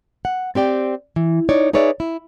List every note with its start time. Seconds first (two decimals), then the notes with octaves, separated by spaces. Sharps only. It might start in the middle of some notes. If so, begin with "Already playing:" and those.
0.25 F#5
0.55 C4 G4 D5 G5
1.16 E3
1.49 D#4 C#5 D5
1.73 D#4 G#4 B4 C#5 D5 E5
2.00 E4